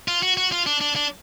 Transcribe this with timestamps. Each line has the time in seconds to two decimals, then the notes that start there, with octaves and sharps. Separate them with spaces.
0.08 F4
0.23 F#4
0.37 F#4
0.52 F4
0.66 D4
0.81 D4
0.96 D4